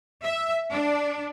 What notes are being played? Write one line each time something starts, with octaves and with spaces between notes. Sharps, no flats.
E5
D4